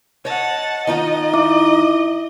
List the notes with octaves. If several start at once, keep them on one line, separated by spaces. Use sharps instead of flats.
C#5 D#5 F#5 A5
D#3 D#4 F4 D#5
E4 E5 D6